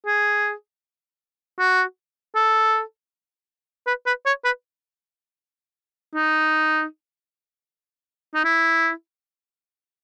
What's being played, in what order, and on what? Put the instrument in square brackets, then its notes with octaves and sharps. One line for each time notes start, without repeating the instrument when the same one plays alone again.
[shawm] G#4
F#4
A4
B4
B4
C#5
B4
D#4
D#4
E4